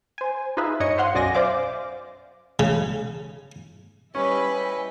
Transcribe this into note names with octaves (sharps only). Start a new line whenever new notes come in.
C5 G#5
D#4 F4 G#4 B4 E5
G2 C#5 D#5 C#7
C5 F5 F#5 C6
B1 F#2 D5 D#5 G#5 A#6
C5 D5 E5 F5 D6
C#3
G3 C#4 E4 B4 D#5 G#5 B5